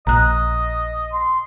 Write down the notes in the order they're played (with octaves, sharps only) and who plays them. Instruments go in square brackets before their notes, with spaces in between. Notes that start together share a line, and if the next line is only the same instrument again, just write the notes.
[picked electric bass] A#1 [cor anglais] D#5 [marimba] A#5 F#6
[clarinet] C6